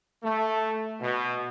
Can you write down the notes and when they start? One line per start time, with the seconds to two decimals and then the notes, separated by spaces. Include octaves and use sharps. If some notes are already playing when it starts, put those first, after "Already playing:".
0.23 A3
1.00 B2